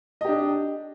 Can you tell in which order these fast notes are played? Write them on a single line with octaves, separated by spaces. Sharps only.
D#5 G4 D4